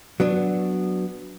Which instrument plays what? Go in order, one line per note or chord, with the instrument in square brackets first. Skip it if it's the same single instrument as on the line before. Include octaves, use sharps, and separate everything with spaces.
[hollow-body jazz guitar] F#3 B3 D4